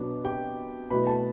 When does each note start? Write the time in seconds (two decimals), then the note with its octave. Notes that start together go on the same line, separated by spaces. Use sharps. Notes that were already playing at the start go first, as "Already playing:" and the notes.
Already playing: B2 F#3 B3 D4
0.24 G4 G5
0.90 B2 F#3 A3 E4 B4 B5
1.07 A4 A5